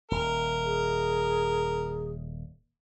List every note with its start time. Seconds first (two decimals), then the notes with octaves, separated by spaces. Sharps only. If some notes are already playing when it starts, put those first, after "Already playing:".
0.11 D#1 A#4
0.65 G#4